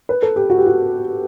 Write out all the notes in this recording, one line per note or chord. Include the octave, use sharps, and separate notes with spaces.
B4
A4
G4
F#4
G4
F#4